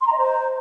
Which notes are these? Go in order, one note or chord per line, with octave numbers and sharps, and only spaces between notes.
C6
A#5
D#5
C5